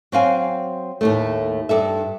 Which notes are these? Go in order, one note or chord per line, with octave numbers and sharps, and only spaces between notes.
F#3 C4 F5 G#5
D#2 A2 A3
G2 A4 E5